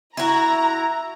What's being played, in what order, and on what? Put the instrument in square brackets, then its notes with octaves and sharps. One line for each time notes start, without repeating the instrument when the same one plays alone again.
[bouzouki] E4 F#4 [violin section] A#5